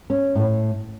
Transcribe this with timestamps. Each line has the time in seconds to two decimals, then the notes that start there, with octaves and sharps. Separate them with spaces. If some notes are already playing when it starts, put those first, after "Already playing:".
0.10 C#4
0.35 A2